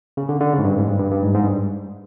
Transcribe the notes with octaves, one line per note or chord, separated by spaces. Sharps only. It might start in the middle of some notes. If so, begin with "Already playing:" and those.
C#3
D3
D3
C#3
G#2
G2
G#2
G2
G2
G2
G#2
G#2
G2